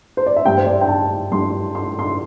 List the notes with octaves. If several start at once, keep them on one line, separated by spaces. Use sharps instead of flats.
C5
D5
E5
G2 G3 G5
C5
D5
E5
G5
A5
G2 G3 C6
C6
C6